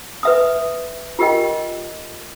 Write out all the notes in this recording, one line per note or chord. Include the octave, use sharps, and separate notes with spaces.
B4 E5 D#6
F4 G4 A#4 D#5 G5